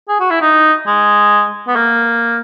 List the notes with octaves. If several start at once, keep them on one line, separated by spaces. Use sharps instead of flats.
G#4
F#4
E4
D#4
G#3
B3
A#3